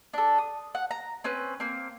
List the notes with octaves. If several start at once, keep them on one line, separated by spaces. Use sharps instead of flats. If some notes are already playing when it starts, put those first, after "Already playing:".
D4 A4
D#6
F#5
A#5
C4 C#4 B4
A#3 C4